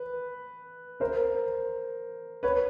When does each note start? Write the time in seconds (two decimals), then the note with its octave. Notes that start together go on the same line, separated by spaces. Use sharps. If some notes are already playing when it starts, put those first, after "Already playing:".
Already playing: B4
1.00 A#4 C5
2.43 B4 C#5